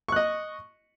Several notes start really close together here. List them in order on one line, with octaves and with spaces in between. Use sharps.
C#6 F#6 D#5